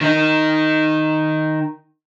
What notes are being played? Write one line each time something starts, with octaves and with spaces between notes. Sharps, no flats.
D#3 D#4